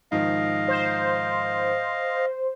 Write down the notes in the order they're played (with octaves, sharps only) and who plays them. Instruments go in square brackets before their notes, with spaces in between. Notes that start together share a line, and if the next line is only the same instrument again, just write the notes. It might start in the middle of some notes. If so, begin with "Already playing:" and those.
[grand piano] G#2 D#3 F3 [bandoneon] D#5 F5
[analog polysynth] C5